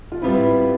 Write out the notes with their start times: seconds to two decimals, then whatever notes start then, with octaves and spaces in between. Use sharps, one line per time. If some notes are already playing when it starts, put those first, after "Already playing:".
0.12 F4
0.22 A2 G3 B3 C4 E4 F4 B4